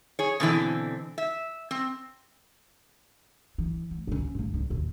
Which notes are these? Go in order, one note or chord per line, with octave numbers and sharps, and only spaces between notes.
G#4 C#5
B2 D3 E3 C4
E5
C4
E3
D2
C#2 C#4
D#2 G#2
C#2
D#2 A#2